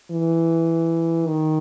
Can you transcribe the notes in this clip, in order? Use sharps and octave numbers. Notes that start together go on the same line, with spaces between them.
E3
D#3